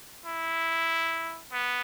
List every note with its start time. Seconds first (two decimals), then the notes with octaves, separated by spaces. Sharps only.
0.26 E4
1.52 B3